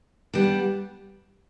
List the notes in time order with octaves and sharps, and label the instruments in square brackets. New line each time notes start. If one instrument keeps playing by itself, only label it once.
[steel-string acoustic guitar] G3 B3 D4